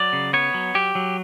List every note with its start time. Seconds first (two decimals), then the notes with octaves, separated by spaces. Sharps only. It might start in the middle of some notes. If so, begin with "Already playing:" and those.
Already playing: F#3 D5
0.13 C#3
0.33 B3 C#5
0.54 F#3
0.75 F#3 G4
0.95 F#3